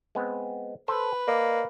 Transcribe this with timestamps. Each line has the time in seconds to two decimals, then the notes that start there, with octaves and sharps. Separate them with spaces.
0.15 G#3 B3 C4
0.88 A4 B4 C5
1.28 A#3 D5 D#5